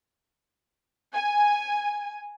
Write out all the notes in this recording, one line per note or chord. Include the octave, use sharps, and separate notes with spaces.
G#5